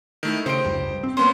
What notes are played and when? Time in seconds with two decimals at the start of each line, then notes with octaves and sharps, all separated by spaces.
0.23 D#3 A3 E4
0.46 C#3 D#4 G4 C5 C6 D7
0.65 F1 C#2 G2
1.03 C4
1.17 A#3 B3 C#4 C5 C6 D#6